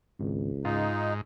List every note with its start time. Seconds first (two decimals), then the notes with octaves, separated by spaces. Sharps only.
0.20 G#1 C#2
0.65 G#2 D#4 F4